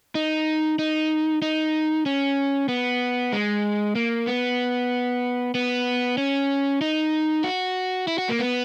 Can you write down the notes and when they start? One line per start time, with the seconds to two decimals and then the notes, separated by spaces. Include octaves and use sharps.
0.15 D#4
0.79 D#4
1.42 D#4
2.06 C#4
2.68 B3
3.33 G#3
3.95 A#3
4.27 B3
5.55 B3
6.18 C#4
6.81 D#4
7.44 F#4
8.08 E4
8.18 F#4
8.29 A#3
8.39 B3